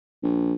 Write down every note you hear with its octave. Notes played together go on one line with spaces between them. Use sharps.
A#1